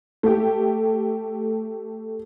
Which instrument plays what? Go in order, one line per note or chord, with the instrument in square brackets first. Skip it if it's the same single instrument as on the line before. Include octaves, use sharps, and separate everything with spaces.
[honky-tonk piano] A3 G4